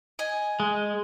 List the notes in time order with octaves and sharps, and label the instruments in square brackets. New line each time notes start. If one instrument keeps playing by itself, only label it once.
[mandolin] D#5 G#5
[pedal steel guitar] G#3